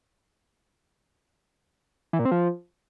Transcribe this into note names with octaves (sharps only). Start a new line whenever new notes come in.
E3
A#2
C4
F3